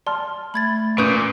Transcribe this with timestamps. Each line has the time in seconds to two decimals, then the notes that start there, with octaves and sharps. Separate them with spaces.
0.07 D5 A5 C6 F6
0.54 A3 B5 G#6 A6
0.98 A#2 C#4 B4 C#6 D#6 G6